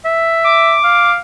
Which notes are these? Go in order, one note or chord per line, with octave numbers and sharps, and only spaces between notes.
E5
D6
F5